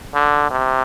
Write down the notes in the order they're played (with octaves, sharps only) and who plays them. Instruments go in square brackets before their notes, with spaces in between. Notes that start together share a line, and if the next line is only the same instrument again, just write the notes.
[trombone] D3
C3